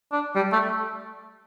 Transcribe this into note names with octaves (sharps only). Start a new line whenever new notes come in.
D4
G3
A3